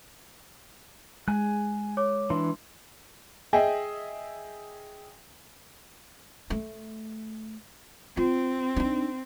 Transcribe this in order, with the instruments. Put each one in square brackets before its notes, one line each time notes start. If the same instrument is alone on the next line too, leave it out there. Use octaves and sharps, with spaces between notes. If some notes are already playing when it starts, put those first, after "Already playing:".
[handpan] G#3 [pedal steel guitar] G#5 F#6
[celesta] C#5 D6
[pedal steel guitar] E3 D4 [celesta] C6
[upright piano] G#4 D#5 E5 G5
[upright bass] A3
[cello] C4 [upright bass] F4
[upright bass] D4 D#4